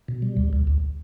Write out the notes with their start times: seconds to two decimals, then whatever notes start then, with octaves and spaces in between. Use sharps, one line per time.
0.08 B2
0.22 G3
0.37 D2
0.53 D2
0.67 D2